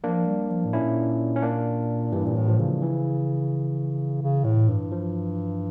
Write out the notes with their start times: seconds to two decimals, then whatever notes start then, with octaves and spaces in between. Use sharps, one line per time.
0.04 F3 A#3 D4
0.27 G3
0.50 F3
0.65 A2
0.73 A#2 C#4 E4
1.36 C#4
1.43 A#3 D4
2.12 G2 E3 G3
2.26 A#2
2.36 A2
2.48 F3
2.59 C#3
2.82 E3
4.22 C#3
4.44 A2
4.69 G2
4.92 F3